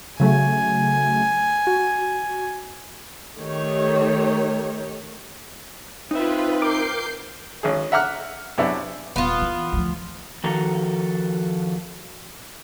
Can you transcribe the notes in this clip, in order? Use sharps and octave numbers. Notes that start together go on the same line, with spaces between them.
C#3 F#3 A3 G#5
F#4
D#3 A3 G4 C#5
C4 D#4 F4 B4 E5
A#4 D6 G6 C7
G#1 C#4 G#4
E5 F#5 A#5 D6 F6 F#6
F#2 C3 B3 D4 E4
D#1 B3 F4
E3
D2 F3
D#3 F3 F#4 A4 A#5